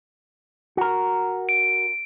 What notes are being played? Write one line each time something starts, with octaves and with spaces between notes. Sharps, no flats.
F#4 A#4
D7